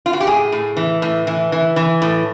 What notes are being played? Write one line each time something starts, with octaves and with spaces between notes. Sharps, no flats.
F4
F#4
G4
A2 G#4
A2
E3
A2
E3
E3
E3
A2